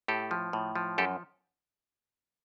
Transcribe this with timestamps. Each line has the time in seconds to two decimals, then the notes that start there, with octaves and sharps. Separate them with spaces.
0.08 A2 G4 A4
0.31 F3
0.53 A2
0.75 F3
0.98 F#2 G4 A4